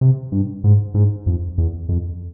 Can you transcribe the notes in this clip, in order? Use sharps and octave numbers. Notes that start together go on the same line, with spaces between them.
C3
G2
G#2
G#2
F2
E2
F2